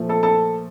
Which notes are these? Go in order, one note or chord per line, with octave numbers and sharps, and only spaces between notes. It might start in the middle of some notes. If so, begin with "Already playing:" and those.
Already playing: A#2 F3 A3
A4 A5
A4 A5